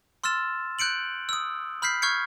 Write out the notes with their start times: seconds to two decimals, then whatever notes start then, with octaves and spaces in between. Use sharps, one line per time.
0.24 C6 E6 F6 A6 E7
0.79 F#6 G6 C#7 D7 F#7
1.29 D#6 E6
1.82 B5 F6 G6 B6 C7
2.02 C#6 F6 G6 G#6 C7 C#7